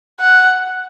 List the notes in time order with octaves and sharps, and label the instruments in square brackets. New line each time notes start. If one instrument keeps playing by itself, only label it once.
[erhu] F#5